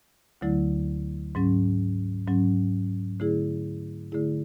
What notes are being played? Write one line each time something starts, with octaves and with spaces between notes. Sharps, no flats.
D2 D3 F#3 A3 E4
G#2 F#3 C#4
G#2 F#3 C#4
D3 A3 E4 G#4
D3 A3 E4 G#4